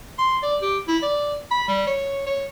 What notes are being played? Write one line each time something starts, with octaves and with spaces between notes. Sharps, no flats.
C6
D5
G4
E4
D5
B5
G3
C#5
C#5